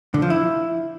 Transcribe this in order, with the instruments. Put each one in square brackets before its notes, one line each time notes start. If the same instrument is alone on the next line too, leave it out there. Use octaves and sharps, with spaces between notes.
[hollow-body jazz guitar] D3
F3
E4